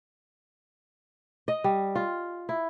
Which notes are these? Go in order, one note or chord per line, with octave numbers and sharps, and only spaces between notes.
D#5
G3
F4
E4